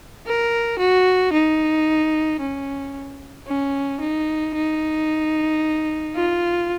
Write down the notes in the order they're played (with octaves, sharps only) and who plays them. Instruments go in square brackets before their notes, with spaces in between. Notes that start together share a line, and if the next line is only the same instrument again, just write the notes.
[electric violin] A#4
F#4
D#4
C#4
C#4
D#4
D#4
F4